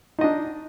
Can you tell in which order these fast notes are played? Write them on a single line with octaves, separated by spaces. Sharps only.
D#4 D#5 D4